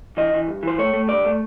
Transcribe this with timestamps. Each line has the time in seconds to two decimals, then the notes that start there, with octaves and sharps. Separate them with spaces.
0.17 E3 D#5
0.33 E3
0.48 G2
0.63 E3 C5
0.79 A3 C#5
0.93 A3
1.09 G2 D5
1.25 A3